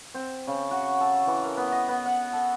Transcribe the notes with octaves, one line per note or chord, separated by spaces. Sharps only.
C4
C#3
F#4
A4
E3
A#4
B3
D#5
B3
F#5
A4